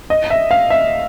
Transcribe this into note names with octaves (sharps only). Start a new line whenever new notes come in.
D#5
E5
F5
E5